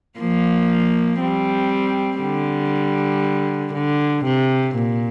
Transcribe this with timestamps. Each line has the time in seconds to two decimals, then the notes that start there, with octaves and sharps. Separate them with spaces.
0.19 F3 A#3
1.21 G3 C4
2.21 D3 G3
3.73 D3
4.25 C3
4.75 A#2